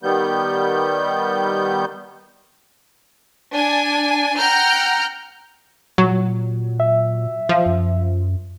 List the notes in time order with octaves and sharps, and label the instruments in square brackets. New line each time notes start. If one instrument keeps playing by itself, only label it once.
[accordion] D#3 G3 B3 G6
[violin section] D4 G#5
F#5 G5 A#5 F6 G6
[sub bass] A#2 [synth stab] F#3
[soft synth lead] E5
[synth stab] F3
[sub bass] F#2